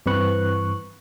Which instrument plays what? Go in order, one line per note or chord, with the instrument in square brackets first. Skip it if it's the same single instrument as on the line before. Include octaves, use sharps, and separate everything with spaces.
[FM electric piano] G2 E3 C4 B4 C#6 F#6